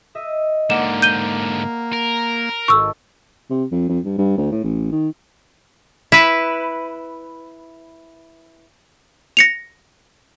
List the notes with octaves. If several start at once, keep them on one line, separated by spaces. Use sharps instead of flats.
D#5 E5
G#2 D3 A#3 D5 F#5 E7
G6 D#7 G7
A#4
G#1 A4 C#6 E6
C3
F2
F2
G2
G2
D2
A2
A1
D#3
E4 B4
A#6 C#7 F7